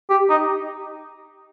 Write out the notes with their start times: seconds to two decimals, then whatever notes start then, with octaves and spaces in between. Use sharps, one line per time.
0.10 G4
0.30 D#4